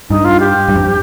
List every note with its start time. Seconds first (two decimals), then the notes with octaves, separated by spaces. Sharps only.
0.10 G2 D#4
0.25 F4
0.40 G4
0.69 G2
0.76 F2